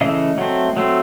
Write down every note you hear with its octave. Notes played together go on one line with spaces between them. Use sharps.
C#3 E3 A3 D#5 F5
F#3 A3 C4
F#3 A3 C4